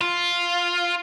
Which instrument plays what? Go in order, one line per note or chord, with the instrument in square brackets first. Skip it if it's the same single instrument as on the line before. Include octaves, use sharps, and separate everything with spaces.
[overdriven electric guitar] F4